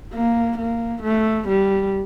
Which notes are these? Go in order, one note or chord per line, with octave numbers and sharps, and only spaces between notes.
A#3
A#3
A3
G3